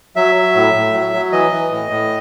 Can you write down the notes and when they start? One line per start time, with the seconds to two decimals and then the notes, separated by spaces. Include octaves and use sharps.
0.16 F#3 E5
0.35 F#3
0.55 A2
0.74 A2
0.94 F#3
1.13 F#3
1.32 E3 D#5
1.52 E3
1.71 A2
1.90 A2